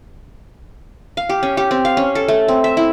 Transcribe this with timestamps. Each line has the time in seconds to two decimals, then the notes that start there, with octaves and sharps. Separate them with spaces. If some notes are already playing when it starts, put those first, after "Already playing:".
1.17 F5
1.29 G4
1.43 C#4
1.57 G4
1.71 C4
1.85 F5
1.97 C#4
2.15 A4
2.28 A3
2.48 C4
2.64 E5
2.77 E4